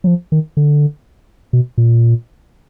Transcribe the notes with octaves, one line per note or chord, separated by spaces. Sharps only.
F#3
F3
D#3
D3
B2
A#2